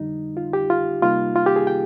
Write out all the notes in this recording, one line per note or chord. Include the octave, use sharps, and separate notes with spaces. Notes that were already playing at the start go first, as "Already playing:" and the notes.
Already playing: F2 D3 G3 D#4
F4
G4
F4
C3 G3 A#3 D#4 F4
F4
G4
G#4
G5